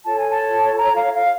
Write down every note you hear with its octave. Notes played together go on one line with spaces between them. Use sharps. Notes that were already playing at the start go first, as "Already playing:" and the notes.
F4 A4 C#5 A5
G#5
A5
A#5
F5
F5